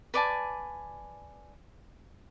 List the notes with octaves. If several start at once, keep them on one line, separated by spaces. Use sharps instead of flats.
B4 D5 G#5 A5